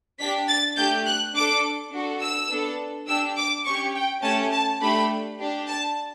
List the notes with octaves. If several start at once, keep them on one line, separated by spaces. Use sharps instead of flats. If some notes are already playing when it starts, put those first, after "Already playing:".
D4 G4 B6
A6
A3 D4 G4 G6
F#6
D4 A4 D6
D4 F#4 A4
E6
B3 D4 A4
D4 G4 E6
D6
C#4 G4 C#6
G5
A3 C#4 G4 A5
A5
A3 D4 G4 B5
D4 G4
A5